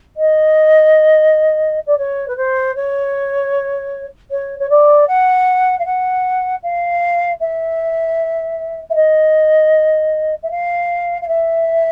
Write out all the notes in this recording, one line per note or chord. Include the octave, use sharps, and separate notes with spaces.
D#5
D5
C#5
B4
C5
C#5
C#5
C#5
D5
F#5
F5
F#5
F5
E5
E5
D#5
E5
F5
F5
E5